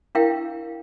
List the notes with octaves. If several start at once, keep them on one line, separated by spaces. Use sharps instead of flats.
D4 E4 A#4 F5 G5